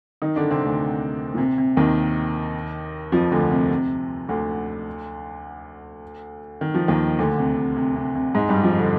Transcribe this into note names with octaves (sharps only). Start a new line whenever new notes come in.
D#3 D#4
D3 D4
C3 C4
D2 D3
A#2
C3
C3
D#2 D#3
F2 F3
D2 D3
C3
C3
D2 D3
D#3
F3
D#2 D#3
D2 D3
C3
C3
C3
C3
C3
G#2 G#3
G2 G3
F2 F3
D3